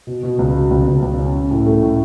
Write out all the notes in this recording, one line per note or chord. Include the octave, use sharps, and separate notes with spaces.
B2
B2
C#2
B2
C#2
C#2
C#2
C#4
C#4
A2
A3
A2